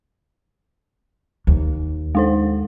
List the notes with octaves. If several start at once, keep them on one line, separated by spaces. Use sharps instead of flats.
D#2
G#3 D#4 C5